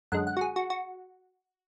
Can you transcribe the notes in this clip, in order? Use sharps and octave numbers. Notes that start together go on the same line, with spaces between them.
F#2 D3 G#3 F#5
F#5
F#4
G#4
F#4
F#4